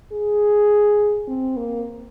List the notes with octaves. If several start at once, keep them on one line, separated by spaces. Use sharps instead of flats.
G#4
C4
A#3